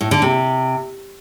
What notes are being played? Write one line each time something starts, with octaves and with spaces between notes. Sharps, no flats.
A2
D3
C3